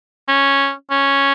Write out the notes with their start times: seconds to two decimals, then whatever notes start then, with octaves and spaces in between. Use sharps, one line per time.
0.28 C#4
0.91 C#4